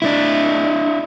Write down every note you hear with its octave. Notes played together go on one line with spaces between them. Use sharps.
D4 E4